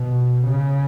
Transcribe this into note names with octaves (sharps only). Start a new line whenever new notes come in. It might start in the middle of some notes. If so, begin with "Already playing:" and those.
Already playing: B2
C#3